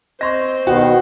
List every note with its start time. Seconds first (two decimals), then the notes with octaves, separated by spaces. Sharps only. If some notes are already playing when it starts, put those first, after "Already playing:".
0.21 C4 C5 D#5 C6 C#6 A#6
0.67 B2 D#3 B3 F#4 G5